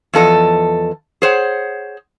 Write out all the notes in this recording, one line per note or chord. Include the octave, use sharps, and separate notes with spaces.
E2 F3 A4 D#5
G#4 C5 C#5 F#5